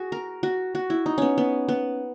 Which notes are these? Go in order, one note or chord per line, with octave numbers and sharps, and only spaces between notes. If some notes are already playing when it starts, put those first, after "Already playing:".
Already playing: F#4 G#4
A#4
F#4
F#4
E4
D#4
B3 C#4
B3
B3